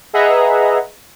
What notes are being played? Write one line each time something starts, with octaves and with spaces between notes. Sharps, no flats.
G#4 B4 D#5 E5 F#5 A#5